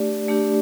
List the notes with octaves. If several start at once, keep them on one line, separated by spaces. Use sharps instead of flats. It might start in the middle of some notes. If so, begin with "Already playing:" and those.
Already playing: A3 D4 G4 D5
A3 D4 G4 D5